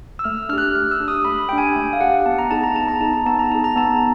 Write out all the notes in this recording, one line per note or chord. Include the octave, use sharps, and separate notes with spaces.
E6
A3 F6
D4 G4 F6 F#6
A3 F6
E6
D4 G4
D#6
A3 B5
D4 G4 G5
G#5
A3
F5
D4 G4 F#5
B3 A5
A#5
D#4 G#4 A5
A#5
B3 A5
A#5
D#4 G#4 A5
A#5
B3 A5
A#5
D#4 G#4 A5
A#5
B3 A5